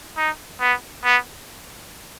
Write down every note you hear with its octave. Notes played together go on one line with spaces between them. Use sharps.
D#4
B3
B3